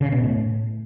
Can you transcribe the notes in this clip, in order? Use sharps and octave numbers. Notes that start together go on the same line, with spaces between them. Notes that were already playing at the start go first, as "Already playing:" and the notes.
C#3
B2
A2